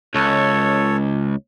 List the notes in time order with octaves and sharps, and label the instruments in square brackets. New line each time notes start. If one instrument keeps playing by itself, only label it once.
[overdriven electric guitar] C#2 [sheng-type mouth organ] A4 C#5